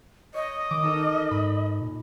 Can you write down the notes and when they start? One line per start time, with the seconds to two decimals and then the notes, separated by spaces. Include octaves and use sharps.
0.34 C#5 D#5
0.71 D#3 D6
0.83 D#4 A4 A#4
1.31 G#2 B5
1.81 A#2